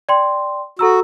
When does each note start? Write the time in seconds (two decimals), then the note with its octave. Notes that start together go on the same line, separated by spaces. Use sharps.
0.09 D5 G5 C6
0.79 F#4 A4 A#5 E6